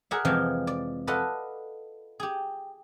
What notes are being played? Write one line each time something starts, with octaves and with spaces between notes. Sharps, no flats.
G#4 A#4 D5 E5 F#5
F2 C3 E3 F3 G#3 F4
D5
F4 A4 B4 D5 D#5 F#5
G4 G#4